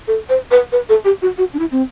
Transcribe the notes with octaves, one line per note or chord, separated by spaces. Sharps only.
A4
C5
B4
B4
A4
G4
F#4
F#4
D4
E4
C4